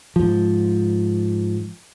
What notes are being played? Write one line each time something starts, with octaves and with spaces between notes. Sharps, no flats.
G#2 F3